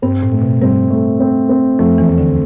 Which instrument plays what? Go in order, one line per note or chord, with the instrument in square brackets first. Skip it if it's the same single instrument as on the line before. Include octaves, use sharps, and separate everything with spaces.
[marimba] G2 [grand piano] C4
[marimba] A2
[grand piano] A3
[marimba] B2
[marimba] G2 G3 [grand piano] C4
[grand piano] A3
C4
C4
[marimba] F2 F3 [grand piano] A3
[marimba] E2 E3
[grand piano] A3
[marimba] D2 D3